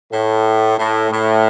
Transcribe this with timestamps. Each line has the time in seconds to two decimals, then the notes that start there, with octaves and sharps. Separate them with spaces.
0.11 A2
0.78 A2
1.11 A2